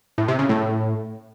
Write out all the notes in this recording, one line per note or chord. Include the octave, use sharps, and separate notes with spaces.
A2
C3
C#3
A2